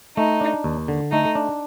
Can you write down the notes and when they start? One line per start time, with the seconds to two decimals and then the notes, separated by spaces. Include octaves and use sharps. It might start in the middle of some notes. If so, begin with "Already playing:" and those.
0.17 A3 D#4
0.41 D4
0.64 D#2
0.88 D3
1.12 A3 D#4
1.35 D4